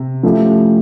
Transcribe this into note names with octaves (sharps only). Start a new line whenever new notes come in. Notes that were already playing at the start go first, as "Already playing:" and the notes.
Already playing: C3
F3 A3 C#4 E4 G4